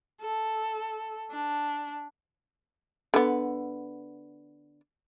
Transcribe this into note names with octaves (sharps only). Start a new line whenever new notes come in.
A4
D4
D3 B3